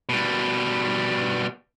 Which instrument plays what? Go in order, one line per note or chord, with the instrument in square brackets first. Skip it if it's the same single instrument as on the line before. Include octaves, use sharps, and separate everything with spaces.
[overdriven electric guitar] B2 G3